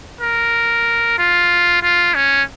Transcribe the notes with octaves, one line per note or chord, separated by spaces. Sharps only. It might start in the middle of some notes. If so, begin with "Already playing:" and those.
A#4
F4
F4
C#4